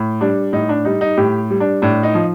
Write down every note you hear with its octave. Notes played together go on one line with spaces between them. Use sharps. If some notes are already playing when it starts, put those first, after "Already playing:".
Already playing: A2
G3 D4
A2 D#4
D4
G3 D#4
D#4
A2 G4
G3
D4
A2 D4
D#4
F3